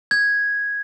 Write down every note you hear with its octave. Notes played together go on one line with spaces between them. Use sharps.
G#6